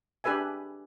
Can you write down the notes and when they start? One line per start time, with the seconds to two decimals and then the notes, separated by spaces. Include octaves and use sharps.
0.24 D4 G4 G#4 B4 E5 G#5